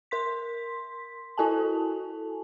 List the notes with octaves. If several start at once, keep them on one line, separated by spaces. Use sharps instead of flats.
A#4 C6 B6
E4 F#4 A4 G#5 A5